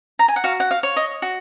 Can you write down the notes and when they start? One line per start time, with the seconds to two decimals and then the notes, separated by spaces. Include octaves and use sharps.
0.19 A#5
0.28 G#5
0.36 F#5
0.44 F#4 F5
0.60 F#5
0.71 F5
0.83 C#5
0.96 D#5
1.22 F#4